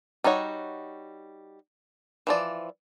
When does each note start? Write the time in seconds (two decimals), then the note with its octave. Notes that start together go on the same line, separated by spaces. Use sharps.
0.24 G3 D#4 F#4 C#5 F#5
2.27 E3 F3 D5